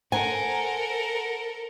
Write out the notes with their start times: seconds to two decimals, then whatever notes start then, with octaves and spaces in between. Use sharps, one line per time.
0.12 A4 A#4 C5 F#5 G#5 A#5